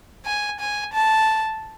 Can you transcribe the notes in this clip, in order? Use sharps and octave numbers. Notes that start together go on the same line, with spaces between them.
G#5
G#5
A5